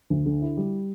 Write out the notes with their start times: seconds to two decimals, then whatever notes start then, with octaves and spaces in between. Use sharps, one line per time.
0.10 D2
0.26 D3
0.42 E4
0.57 G3